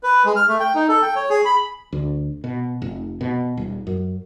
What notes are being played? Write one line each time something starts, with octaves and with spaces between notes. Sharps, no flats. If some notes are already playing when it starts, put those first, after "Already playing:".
B4
G#3
F6
A3
G5
D#4
A4
G5
C#5
G#4
B5
D2
B2
F1
B2
D#1
F#2